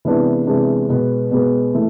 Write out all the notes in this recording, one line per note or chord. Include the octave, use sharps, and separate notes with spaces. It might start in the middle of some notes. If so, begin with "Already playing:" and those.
C3 E3 G#3 B3 D4
C3 E3 G#3 B3 D4
B2 G#3 B3
B2 G#3 B3
E3 A3